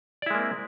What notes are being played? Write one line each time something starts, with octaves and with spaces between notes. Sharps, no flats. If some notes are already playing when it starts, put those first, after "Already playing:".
G#3 A#3 C4 E4 D5